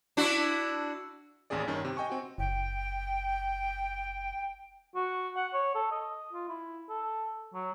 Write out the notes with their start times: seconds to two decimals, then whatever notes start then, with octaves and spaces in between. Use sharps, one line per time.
0.17 D4 E4 F#4
1.50 A1 D#2 C#4 G#4 D5
1.68 G2 D#3 C#4
1.85 C3
1.97 D#5 G5 G#5 C#6
2.10 C4 F#4
2.38 F#1 G5
4.95 F#4
5.36 F#5
5.53 C#5
5.75 A4
5.91 D#5
6.33 F4
6.48 E4
6.89 A4
7.53 F#3